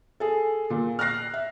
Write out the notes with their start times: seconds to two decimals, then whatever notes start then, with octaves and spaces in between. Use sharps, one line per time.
0.20 G#4 A4
0.70 A#2
0.99 F6 F#6 A#6 C7
1.34 E5